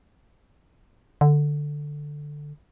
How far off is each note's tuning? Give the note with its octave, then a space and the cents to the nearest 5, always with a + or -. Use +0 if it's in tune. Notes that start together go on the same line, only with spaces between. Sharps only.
D3 +5